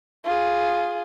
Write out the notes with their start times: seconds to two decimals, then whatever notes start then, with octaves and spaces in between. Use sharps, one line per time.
0.25 F4 G#4